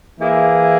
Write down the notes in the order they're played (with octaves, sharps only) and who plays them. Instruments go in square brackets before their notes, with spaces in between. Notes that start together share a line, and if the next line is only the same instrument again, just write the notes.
[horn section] E3 A#3 E4 G#4